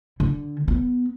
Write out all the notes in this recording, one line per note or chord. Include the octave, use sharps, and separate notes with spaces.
D3
B3